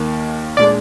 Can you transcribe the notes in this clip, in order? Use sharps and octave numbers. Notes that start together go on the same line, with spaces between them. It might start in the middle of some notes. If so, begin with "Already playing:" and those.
Already playing: D#2 D#3 A#3
A#2 G#3 D4 D5